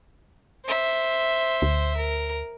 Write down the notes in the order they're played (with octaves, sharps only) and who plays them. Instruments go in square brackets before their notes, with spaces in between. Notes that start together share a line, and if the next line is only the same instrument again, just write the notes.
[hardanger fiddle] C5 E5
[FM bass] D2
[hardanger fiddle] A#4